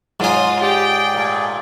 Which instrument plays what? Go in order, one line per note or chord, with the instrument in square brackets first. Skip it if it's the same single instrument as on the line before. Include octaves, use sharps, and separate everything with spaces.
[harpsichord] G#2 G#5 [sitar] F#3 [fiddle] F4 D#6
[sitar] G4 [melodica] G#4 D5 [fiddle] G5
[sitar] A#2 A3